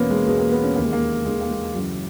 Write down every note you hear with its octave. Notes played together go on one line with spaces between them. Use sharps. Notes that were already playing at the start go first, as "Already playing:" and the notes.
Already playing: E2 B2 A#3 B3 C#4
G#3
E2 B2 G#3
A#3
B3
C#4
D#2 D#3 A#3
G#3
A#3
D#2 D#3 G#3
A#3
G#3
F#2 C#3 E3 F#3